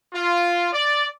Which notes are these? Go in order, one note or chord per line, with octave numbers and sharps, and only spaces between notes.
F4
D5